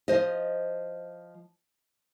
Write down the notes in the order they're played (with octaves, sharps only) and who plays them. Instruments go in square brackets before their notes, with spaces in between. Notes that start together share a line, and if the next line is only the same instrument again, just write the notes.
[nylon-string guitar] F3 C5 D#5